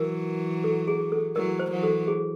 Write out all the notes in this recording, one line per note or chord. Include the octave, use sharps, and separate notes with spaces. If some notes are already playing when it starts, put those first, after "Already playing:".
Already playing: E3 F#3 A#4
A4
G#4
A4
E3 F#3 A#4
C5
E3 F#3
A4
G#4